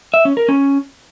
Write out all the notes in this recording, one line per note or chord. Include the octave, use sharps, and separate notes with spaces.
E5
C#4
A#4
C#4